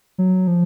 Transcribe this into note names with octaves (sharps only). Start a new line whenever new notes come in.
F#3
F3